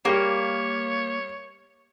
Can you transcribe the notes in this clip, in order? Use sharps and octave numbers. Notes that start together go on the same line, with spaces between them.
G3 A#3 G4 C#5